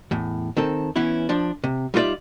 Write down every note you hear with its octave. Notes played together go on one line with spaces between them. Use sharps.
E2 A2
D#3 C4 A4
E3 B3 C#4 E4
F3 D4
C3
G3 D#4 F4 F#4 D5 E5